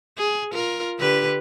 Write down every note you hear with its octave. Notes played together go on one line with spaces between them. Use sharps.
G#4
F4 A#4
D3 G4 B4